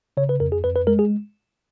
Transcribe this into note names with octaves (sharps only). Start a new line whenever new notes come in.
C#3 C#5
B4
F2 A#4
G#4
F2 B4
B4
G#3 A#4
G#4